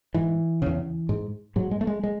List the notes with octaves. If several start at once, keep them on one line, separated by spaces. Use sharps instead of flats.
G#2 E3
E2 C#3
G#2
G#2 F#3
G#3
A3
G#3
G#3